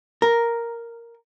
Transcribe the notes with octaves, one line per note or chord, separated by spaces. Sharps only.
A#4